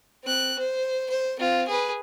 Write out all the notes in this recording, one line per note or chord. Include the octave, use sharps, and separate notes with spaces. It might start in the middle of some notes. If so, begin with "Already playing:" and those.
C4 F#6
C5
C5
C4 F4
G#4 B4